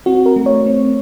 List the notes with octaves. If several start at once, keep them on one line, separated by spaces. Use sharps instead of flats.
C4 F#4
A#4
A3
C#5
C4